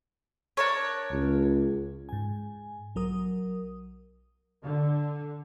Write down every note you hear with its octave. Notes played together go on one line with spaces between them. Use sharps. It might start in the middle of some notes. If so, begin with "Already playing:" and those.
D4 A#4 C#5
C#2
G#2 G#5
B1 F#3 A#4 D#6
D3